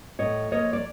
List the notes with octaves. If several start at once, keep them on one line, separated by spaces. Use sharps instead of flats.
A2 C#5 D#5
F3 A#3 C#5 D#5
D5